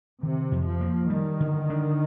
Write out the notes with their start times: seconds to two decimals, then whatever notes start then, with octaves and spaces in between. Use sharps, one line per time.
0.23 C3 D#3
0.52 F2
0.67 F3
0.81 A#3
1.10 D#3 G3
1.40 D3
1.70 D4